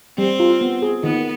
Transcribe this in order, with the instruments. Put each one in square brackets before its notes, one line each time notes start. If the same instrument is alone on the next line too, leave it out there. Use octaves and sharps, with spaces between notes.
[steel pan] G3 [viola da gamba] C4
[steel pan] F4
B3
G#4
[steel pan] D#3 [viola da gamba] B3